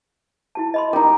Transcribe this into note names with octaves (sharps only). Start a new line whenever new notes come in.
E4 F#4 A5
D#5 B5 C6
D#4 G4 A#4